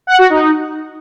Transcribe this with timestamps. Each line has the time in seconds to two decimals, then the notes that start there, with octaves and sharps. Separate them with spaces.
0.07 F#5
0.18 F#4
0.30 D#4